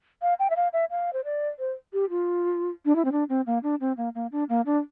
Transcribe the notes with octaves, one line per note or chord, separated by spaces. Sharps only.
F5
G5
E5
F5
E5
F5
C5
D5
C5
G4
F4
D4
E4
C4
D4
C4
A#3
D4
C4
A#3
A#3
D4
A#3
D4